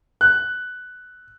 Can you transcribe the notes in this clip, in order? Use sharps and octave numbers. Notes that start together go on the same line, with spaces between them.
F#6